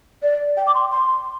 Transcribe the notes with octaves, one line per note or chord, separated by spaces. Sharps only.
D5
G5
D6
C6
C6